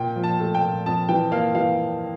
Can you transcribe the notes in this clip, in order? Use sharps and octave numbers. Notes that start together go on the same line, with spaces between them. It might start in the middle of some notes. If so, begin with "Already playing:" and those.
Already playing: A#2 G5
F3
A5
A3
G5
A#2
F2 A5
E3 G5
A#3 F5
E3 F5